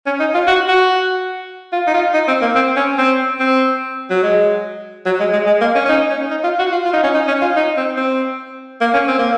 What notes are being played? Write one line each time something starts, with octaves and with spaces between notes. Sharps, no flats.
C#4
D#4
F4
F#4
F#4
F4
D#4
F4
D#4
C4
A#3
C4
C#4
C4
C4
F#3
G#3
F#3
G#3
G#3
G#3
A#3
C#4
C#4
D#4
C#4
D#4
F4
F#4
F4
F4
D#4
C#4
D#4
C#4
F4
D#4
C4
C4
A#3
C#4
C4
A#3